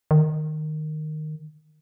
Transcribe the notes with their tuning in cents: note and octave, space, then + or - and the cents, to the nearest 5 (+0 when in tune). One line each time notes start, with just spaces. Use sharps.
D#3 -15